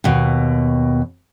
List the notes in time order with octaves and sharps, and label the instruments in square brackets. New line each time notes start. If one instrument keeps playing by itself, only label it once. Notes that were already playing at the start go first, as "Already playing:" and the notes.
[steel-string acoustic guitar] D#2 B2